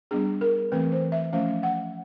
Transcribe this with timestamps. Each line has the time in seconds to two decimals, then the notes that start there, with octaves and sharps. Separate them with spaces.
0.11 G3 B3 D4 G#4
0.41 A#4
0.72 E3 A3 C4 B4
0.92 C5
1.12 E5
1.33 F3 A3 C#4 F5
1.63 F#5